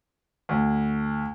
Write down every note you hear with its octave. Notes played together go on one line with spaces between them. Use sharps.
D2